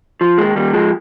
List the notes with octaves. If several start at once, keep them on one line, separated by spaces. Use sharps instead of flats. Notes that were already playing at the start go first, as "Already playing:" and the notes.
F3
D#2 G#3
D#2 G3
F3 G#3